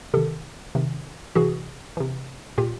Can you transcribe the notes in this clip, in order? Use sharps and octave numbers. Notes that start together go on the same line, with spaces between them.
C3 D#3 G4 A4
C3 D#3
C3 E3 F#4 G#4
C3 E3
A#2 F4 G4